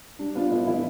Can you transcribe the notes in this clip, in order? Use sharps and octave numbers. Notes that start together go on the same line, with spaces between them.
G3 D4
B3 D4 F4
A2 E4
E3 E4